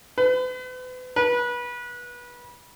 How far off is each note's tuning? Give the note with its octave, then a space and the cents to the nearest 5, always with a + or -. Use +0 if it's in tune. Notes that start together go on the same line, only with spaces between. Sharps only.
B4 +40
B4 -25